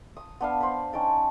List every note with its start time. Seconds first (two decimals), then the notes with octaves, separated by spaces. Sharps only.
0.17 D#6
0.41 B3 D4 F5
0.60 C5 B5
0.93 C#4 D#4 G5 A5